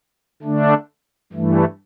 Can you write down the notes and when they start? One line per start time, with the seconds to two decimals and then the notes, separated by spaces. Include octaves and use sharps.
0.42 D3 A3 D4
1.33 G2 E3 A3